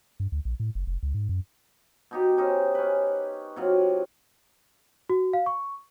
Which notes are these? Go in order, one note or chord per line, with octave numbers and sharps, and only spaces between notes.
G2
D2
A#1
A2
F#1
F1
C#2
G#2
F#2
B2 D#4 G4
C#4 D#4 G4 C5
C#4 B4
C3 F#3 F4
F#4
F5
C#6